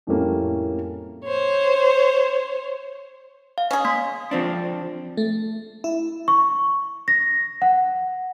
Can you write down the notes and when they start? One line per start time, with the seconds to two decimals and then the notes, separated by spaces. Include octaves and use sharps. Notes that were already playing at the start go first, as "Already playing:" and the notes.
0.07 F2 A2 G3 A3 A#3 C#4
1.25 C5 C#5
3.58 F5
3.71 C#4 G#4
3.85 A#3 C6 B6
4.31 F3 C4 D4
5.17 A3
5.84 E4
6.28 C#6
7.08 A#6
7.62 F#5